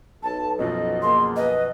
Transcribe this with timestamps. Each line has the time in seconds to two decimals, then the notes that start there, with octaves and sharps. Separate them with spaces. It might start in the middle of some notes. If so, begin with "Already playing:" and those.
0.23 B1 A5
0.59 F#2 B2 F3 D#5
1.02 A#3 G#4 C6
1.36 B4 D#5